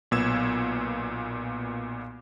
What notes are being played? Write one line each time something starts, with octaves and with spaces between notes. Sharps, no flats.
B1 A#2 B3 E6 G#6 E7